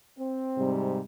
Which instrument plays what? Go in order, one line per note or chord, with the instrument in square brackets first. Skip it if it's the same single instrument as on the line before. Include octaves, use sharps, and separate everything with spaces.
[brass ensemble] C4
[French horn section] G#2 C3 G3